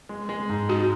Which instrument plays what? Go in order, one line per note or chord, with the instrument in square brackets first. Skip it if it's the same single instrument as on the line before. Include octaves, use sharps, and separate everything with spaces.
[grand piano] G#3
G#3
G#2
[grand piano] D#4 [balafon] F#4